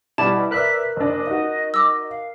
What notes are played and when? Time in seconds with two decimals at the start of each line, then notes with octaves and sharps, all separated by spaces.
0.18 B2 G3 E4 D5 A5
0.51 A#4 B4 D5 E5 F#6 B6
0.96 F#1 D4 D#5
1.27 D#4 F#4
1.74 D6 E6
2.09 F5